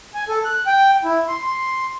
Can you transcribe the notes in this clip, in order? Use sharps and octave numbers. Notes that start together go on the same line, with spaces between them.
G#5
A4
F#6
G5
E4
C6
C6